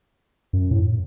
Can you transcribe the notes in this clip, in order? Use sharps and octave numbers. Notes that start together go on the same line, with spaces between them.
F#2
A2